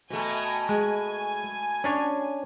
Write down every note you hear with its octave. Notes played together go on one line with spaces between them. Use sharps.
B2 A3 G5 G#5 A#5
G#3 G#5
C#4 D4 C#5